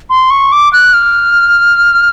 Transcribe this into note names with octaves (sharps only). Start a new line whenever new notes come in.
C6
C#6
D6
F#6
F6